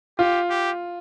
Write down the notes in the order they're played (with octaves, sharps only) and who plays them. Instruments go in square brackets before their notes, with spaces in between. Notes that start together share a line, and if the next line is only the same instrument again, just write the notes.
[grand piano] F4 [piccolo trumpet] G4
[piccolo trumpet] G4